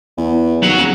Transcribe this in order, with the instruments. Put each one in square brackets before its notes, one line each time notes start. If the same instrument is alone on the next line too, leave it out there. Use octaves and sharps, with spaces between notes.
[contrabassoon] E2
[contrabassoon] D#2 [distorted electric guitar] F#3 F#5
[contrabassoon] C#3